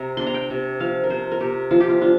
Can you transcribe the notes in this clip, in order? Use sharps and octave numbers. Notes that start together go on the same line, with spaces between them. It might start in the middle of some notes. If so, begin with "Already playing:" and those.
Already playing: C3 A#5
D4 C6
A#5
G5
C3
F3 F5
A#4
C3 C5
A#4
C3 G4
F3 F4
G4
F4
D4 F4